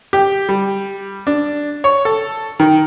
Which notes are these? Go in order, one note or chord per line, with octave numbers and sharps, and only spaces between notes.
G4
G3
D4
C#5
A4
D#3